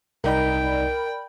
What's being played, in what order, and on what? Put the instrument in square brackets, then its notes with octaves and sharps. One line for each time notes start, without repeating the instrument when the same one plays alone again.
[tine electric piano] C2 D#4 [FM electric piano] A#4 D5 B5 [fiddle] G5